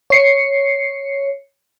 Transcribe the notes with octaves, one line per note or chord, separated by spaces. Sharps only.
C#5 C7 C#7